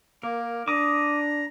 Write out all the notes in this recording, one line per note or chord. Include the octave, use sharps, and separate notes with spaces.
A#3 A#4
D4 A#5 D6 D#6